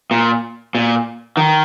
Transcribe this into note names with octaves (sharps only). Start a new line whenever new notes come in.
A#2
A#2
D#3